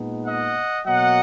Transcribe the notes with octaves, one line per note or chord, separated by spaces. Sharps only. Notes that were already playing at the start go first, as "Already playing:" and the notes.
Already playing: A#2 G#3 B3 D#4
D#5 F#5
B2 F#3 A#3 D#5 F#5